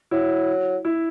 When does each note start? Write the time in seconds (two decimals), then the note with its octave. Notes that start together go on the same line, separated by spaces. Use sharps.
0.11 F#3 E4
0.85 E4